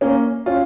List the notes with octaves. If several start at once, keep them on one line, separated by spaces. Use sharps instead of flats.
A#3 C#4
C#4 F4